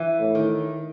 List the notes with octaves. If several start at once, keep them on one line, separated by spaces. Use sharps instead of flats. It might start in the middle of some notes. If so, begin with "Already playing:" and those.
Already playing: E3
A2
D#3